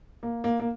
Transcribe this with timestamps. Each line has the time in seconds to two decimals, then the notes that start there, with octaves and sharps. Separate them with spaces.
0.23 A#3
0.44 A#3
0.60 A#3